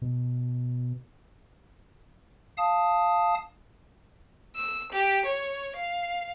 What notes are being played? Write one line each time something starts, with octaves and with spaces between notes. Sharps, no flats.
B2
F5 A5 D#6
E6
G4
C#5
F5